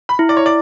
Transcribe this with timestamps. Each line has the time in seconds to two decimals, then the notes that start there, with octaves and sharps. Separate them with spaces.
0.09 B5
0.19 E4
0.29 D5
0.37 C#5
0.46 D5